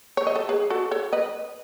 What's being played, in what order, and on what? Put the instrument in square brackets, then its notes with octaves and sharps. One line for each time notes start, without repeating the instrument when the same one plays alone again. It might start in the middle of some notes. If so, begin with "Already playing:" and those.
[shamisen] C#5
D#5
A4 C#5
G#4 B4
F#4 A4
A4 C#5
B4 D#5